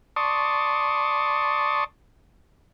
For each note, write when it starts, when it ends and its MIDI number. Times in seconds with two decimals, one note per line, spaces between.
0.16 1.84 74
0.16 1.84 81
0.16 1.84 84
0.16 1.84 85
0.16 1.84 87